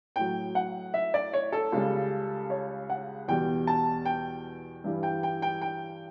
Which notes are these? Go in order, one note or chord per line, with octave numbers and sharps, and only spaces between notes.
A2 F#3 G5
F#5
E5
D5
C#5
A4
C#2 C#3 G3
C#5
F#5
E2 B2 G3 G5
A5
G5
G2 E3 G3
G5
G5
G5
G5